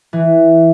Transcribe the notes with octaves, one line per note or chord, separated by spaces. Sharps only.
E3